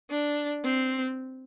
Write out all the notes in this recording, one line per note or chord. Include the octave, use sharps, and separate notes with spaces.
D4
C4